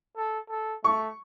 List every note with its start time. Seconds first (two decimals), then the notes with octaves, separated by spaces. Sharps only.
0.17 A4
0.49 A4
0.84 A3 C#6